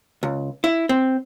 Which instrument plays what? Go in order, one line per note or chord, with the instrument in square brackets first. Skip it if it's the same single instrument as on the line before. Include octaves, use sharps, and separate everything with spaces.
[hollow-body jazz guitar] C#2
E4
C4